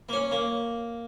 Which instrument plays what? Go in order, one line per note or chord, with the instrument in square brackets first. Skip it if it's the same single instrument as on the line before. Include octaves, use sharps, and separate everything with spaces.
[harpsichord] A#3
C#4
A#3